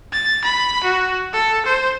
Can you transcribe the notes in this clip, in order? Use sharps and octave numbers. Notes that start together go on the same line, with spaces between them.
A6
B5
F#4
A4
C5